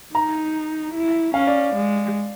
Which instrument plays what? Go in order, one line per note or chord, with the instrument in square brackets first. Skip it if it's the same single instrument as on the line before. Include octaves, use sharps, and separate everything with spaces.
[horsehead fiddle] D#4 [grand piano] A#5
[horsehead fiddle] E4
[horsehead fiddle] C#4 [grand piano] F5
[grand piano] D5
[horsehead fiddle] G#3